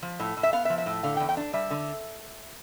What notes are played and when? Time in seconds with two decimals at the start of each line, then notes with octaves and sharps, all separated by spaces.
0.03 F3
0.20 A2
0.37 A2
0.43 E5
0.53 B3 F5
0.65 E5
0.70 F3
0.78 E5
0.86 A2
1.03 D3 F5
1.17 G5
1.20 E2
1.29 G5
1.37 D4
1.53 G3 E5
1.71 D3